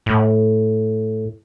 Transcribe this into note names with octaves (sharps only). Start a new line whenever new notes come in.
A2